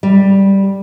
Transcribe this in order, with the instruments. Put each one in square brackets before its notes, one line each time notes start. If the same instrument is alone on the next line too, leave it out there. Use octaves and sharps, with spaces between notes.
[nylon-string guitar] G3